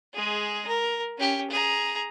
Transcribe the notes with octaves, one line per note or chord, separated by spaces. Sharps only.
G#3 G#4
A#4
C#4 G4
G#4 A#5